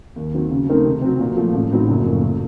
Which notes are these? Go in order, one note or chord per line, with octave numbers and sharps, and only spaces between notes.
D#2
D#3 F#3 C4
C#3
A3 C4 D#4 A#4
C3
F#3 C4
A#2
F3 A3
A1
A2 F#3 C4 D#4
F#1
F#2 F3 A3
A#2